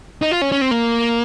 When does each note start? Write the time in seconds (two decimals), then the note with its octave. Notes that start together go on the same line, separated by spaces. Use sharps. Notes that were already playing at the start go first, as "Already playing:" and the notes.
0.22 D#4
0.31 F4
0.42 C#4
0.52 C#4
0.61 C4
0.71 A#3